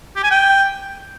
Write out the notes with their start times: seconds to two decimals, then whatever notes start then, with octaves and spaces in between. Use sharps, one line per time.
0.16 G4
0.23 G#5
0.31 G5